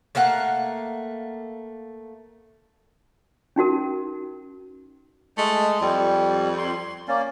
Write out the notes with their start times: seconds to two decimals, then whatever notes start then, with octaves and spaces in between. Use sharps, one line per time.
0.15 A3 A#3 F5 F#5
3.56 C#4 D#4 F#4 A#4
5.38 G#3 A3
5.81 F2 G3
6.58 C6
7.08 A#3 C#4 D5